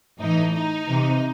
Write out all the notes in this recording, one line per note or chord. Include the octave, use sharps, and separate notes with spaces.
A2 E3 D#4
D#4
C3 E3